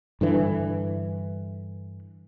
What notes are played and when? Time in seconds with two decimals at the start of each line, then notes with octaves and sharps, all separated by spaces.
0.21 G2 D3 E3